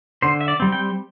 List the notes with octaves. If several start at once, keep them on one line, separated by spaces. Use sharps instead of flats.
D3 C5
E5
D5
G3 C4
G5